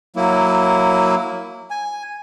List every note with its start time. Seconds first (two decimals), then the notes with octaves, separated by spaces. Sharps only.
0.16 F#3 A#3 E4
1.71 G#5